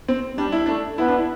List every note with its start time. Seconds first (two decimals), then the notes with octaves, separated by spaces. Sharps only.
0.08 C4
0.38 G3 D4
0.52 E4
0.66 A3 D4
0.98 B3 E4
1.08 D4
1.18 E4